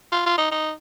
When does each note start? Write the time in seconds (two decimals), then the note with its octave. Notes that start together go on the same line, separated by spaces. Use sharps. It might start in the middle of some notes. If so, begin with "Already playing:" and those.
0.12 F4
0.26 F4
0.38 D#4
0.51 D#4